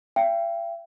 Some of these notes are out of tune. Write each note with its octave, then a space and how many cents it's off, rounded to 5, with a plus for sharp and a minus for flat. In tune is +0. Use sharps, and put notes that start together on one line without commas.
E5 +45 G5 +0